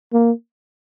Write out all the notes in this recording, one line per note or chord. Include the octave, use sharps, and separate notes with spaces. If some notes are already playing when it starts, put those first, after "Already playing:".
A#3